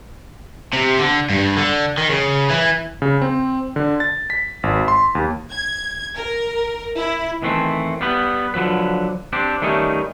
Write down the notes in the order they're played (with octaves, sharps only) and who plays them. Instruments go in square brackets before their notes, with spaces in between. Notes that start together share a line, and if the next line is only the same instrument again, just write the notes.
[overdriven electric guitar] C3
D3
G2
D3
D#3
C#3
E3
[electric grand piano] C#3
C4
D3
A6
B6
G#1
C6
D#2
[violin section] G#6
A#4
E4
[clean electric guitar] D#3 E3 A3 C4
G3 B3 B4
D3 F3 F#3 B4
C4 D4 G4
D#3 G3 A3 C#4 D#4